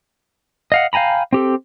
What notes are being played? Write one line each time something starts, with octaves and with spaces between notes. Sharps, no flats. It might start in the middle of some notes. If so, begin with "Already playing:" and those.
D#5 F5 F#5
F5 G5 G#5 A#5 B5
C4 G4 A4